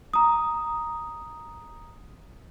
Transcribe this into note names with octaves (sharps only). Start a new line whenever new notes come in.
A#5 D#6